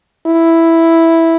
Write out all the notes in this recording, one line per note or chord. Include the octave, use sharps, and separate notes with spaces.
E4